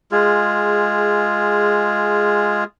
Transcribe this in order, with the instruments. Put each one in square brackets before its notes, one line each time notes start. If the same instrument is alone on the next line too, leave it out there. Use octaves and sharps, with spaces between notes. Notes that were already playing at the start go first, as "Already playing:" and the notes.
[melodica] G#3 F4 G#4